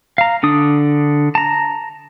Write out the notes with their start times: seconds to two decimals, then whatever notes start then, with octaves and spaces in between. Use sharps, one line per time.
0.18 F5 A#5
0.43 D3 D4 D#6
1.35 A5 A#5